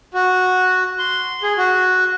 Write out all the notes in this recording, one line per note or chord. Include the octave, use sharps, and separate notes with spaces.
F#4
C6
G#4
F#4